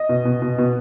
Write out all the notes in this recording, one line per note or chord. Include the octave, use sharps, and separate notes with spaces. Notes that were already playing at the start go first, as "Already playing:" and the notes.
Already playing: D#5
B2
B2
B2
B2